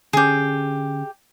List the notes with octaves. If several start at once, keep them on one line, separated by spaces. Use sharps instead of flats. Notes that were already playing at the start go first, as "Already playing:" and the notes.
D3 C#4 G4 G#4